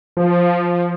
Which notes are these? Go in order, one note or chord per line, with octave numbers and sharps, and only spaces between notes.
F3